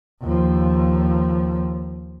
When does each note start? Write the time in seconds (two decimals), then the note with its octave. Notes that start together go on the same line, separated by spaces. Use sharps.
0.23 D#2 F3